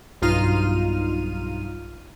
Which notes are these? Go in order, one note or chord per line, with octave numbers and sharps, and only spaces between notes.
B1 G2 D#4 F4 F6 D#7